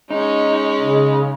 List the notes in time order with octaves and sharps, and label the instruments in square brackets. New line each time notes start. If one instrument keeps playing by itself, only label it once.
[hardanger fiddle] G#3 C#4 [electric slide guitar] D#4
[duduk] C#3